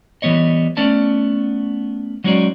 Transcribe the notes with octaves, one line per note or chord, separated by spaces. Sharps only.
E3 G3 B3 C#5 D#5
A3 B3 C#4 D5 A5
F#3 G#3 C#4 D#4 F#4 D5